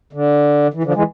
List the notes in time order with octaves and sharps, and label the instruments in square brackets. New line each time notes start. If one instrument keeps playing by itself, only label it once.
[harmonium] D3
E3
D3 F3
E3 G#3